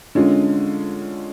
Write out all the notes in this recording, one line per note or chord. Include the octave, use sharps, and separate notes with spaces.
D3 G#3 C#4 F4